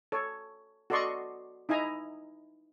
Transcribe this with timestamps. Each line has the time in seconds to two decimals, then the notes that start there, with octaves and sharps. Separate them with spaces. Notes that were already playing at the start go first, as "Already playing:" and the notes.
0.12 A4 C#5
0.90 F#4 A4 D5 D#5 C6 C#6
1.69 D#4 E4 D#5 G#5 A#5